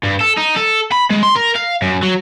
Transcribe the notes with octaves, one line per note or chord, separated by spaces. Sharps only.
G2
A4
D#4
A4
B5
G#3
C6
A#4
F5
F#2
F#3